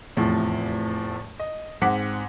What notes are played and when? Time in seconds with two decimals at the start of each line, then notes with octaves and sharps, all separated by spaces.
0.17 F1 E2 A2 C3 F3
1.40 D#5
1.81 G#2 C4 F#5 D6 B6